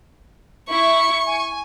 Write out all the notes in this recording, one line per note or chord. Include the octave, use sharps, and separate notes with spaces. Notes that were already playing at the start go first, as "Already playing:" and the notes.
E4 C#6
G#5